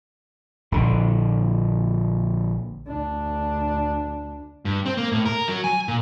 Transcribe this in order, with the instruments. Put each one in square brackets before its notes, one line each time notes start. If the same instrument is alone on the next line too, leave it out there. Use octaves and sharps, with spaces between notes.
[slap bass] A#1 D3
[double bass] D2 D4
[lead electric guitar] G2
C4
A#3
A2
A#4
F#3
G#5
A#2